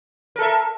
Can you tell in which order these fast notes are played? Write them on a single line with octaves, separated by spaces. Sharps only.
A#4 A4 E5